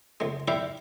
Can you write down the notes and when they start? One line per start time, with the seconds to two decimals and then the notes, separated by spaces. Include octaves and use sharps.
0.20 C#2 G#3
0.48 E4 G4 D5 E5 F5